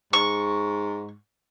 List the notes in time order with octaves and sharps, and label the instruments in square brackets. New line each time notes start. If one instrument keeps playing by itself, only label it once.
[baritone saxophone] G#2 [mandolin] C#6